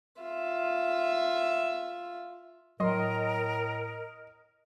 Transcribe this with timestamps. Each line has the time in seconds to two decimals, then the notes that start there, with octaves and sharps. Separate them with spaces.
0.22 F4 E5
2.80 A2 F#3 A#4 D#5 C6